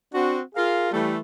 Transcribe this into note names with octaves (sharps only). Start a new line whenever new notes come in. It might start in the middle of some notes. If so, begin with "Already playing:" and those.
C4 D4 F#4
F4 G#4 A#4 F5
E3 G3 A3